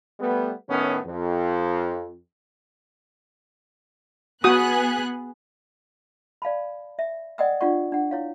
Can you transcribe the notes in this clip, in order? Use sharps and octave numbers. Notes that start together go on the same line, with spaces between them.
G3 A3 B3
A2 D#3 B3 C#4
F2
B3 F#4 G#4 D#6 F#6
D5 F5 A5 B5
E5
D5 D#5 F#5 G5 D#6 E6
D4 F4 D5 F#5 C#6
D4 F#5
E4 C#5 F5